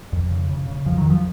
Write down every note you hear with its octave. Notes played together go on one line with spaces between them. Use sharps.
F2
C#3
C#3
C#3
F2 F3
D#3 F#3
F2
F3